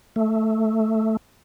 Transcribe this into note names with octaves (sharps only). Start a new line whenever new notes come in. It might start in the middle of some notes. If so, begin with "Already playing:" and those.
A3